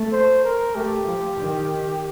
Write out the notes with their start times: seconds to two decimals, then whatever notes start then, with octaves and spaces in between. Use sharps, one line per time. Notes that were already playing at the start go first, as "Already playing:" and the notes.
Already playing: A3
0.12 C5
0.44 A#4
0.75 A3 G4
1.07 F3
1.38 D#3